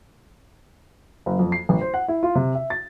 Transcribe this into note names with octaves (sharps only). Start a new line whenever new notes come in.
F#1
F2
C7
A1
C5
F#5
E4
F4
C3
E5
A6